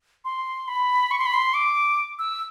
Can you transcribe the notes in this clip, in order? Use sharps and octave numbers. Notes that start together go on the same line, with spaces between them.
C6
B5
C#6
C6
B5
C6
D6
E6